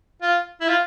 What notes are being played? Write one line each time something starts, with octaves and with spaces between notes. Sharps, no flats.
F4
E4
F4